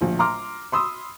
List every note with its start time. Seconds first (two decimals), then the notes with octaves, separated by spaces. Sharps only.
0.01 D1 A#1
0.19 A#5 C6 D6 F6
0.72 B5 C6 D#6 E6